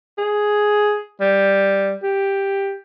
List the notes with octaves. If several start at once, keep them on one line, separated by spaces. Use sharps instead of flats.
G#4
G3
G4